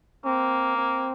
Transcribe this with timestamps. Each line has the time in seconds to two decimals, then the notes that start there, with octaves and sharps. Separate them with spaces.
0.25 A#3 C4
0.77 C4